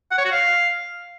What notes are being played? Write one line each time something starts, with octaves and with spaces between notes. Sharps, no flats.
F#5
C#5
F#4
F5